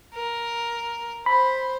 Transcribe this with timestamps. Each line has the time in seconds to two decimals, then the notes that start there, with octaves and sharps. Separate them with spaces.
0.14 A#4
1.26 C5 B5